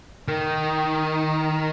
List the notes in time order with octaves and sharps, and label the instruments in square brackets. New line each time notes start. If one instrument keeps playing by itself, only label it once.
[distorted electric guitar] D#3